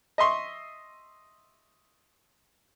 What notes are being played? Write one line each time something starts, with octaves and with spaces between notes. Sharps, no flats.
D#5 E5 C6 C#6